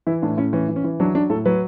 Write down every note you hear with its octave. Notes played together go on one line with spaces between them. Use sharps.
E3 E4
A2 D4
A2 C#4
E3 C#4
E3
C#4
E3
F#3 D4
F#3 D4
A2 A4
F#3 B4